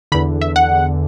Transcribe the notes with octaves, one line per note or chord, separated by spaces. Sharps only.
E2 D3 B5
E5
F#5